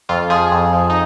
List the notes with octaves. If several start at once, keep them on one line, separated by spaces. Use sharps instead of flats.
F2 F4
F3 G#4
F2
F3
D#4